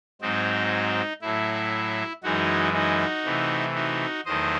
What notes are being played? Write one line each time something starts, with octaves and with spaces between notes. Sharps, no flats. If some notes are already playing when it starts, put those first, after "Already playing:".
G#2 F#3 C4 D#4
A2 F#3 A3 E4
F#2 E3 G#3 D#4 F#4
D#4 F#4
C3 E3 A3
D#4 F#4
E2 D#3 F#3 A3 C5 D#5